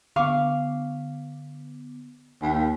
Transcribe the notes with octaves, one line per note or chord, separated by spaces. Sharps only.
D3 B3 F5 C#6 D6
D#2